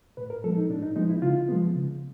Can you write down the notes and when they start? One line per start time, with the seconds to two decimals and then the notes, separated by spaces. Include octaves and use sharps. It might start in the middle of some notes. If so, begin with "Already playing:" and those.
0.17 A2 B4
0.30 A#4
0.44 F3 G#3 B3 A4
0.57 D#4
0.70 A2 D4
0.82 D#4
0.96 F3 G#3 B3 D#4
1.10 E4
1.22 C#3 F4
1.49 F3 G#3 B3
1.75 C#3